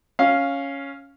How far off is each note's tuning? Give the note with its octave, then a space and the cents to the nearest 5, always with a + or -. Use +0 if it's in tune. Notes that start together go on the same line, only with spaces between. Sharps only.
C#4 +0 F5 +0